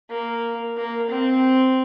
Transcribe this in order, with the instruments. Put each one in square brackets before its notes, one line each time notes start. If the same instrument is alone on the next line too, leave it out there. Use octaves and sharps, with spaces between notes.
[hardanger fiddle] A#3
A#3
C4